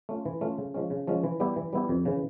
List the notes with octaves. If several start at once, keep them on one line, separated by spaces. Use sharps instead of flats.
A3 C#4 F4
E3
A3 C#4 F4
C#3
F3 G#3 C#4
C#3
F3 G#3 C#4
E3
G3 B3 E4 G4
E3
G3 B3 E4 G4
F2
C#3 E3